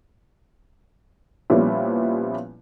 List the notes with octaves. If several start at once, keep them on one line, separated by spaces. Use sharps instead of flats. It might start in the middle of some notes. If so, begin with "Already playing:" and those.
A#2 F3 G3 B3 C#4 E4